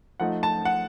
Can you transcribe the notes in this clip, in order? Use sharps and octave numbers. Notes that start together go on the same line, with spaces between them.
F3 A3 D#4 F#5
A5
F#5